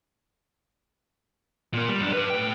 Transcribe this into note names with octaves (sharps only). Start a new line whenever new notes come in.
A#2 A#3
G3
F#2 D4
G4 B4
A2 G5